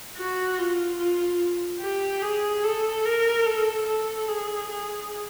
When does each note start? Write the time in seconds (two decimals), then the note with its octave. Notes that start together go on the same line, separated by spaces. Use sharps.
0.16 F#4
0.58 F4
0.99 F4
1.81 G4
2.22 G#4
2.63 A4
3.05 A#4
3.46 A4
3.87 A4
4.28 G#4
4.69 G#4